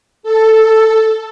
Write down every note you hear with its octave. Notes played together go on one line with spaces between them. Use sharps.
A4